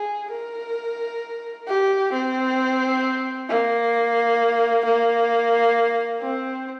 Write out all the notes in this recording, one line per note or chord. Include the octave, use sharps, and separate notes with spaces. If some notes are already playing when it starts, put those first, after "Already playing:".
Already playing: G#4
A#4
G4
C4
A#3
A#3
C4